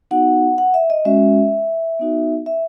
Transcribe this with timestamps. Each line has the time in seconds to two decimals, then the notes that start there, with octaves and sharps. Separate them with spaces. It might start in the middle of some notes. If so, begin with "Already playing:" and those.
0.11 B3 D#4 F#4 F#5
0.58 F#5
0.74 E5
0.90 D#5
1.05 G#3 C#4 F#4 E5
1.99 B3 D#4 F#4
2.46 E5